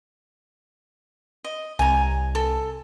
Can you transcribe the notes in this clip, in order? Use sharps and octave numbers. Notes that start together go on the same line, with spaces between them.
D#5
C2 G#5 A#5
A4